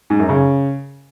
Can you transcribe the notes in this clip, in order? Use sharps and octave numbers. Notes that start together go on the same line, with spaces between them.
G#2
F#2
C#3